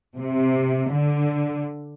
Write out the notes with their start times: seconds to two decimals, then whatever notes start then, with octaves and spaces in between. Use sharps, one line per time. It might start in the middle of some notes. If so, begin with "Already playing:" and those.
0.18 C3
0.93 D3